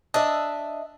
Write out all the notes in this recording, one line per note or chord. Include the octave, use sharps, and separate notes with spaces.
D4 D#5 E5